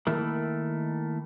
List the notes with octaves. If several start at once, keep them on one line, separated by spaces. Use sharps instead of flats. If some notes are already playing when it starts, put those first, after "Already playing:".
D#3 A3 A#3 E4 A#4